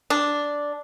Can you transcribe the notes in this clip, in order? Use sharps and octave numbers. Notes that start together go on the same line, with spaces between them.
D4